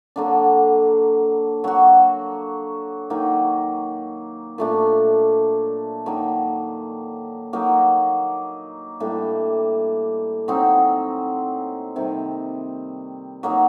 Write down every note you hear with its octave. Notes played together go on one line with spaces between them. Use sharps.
D3 F#3 A#3 D4
F#3 A#3 F#4
D#3 F#3 A#3 D#4
A#2 A3 D4
D#3 F#3 A#3
F#3 A#3 D#4
A2 G3 A#3 D4
F#3 C4 D#4
C3 D#3 G3
F#3 A#3 D#4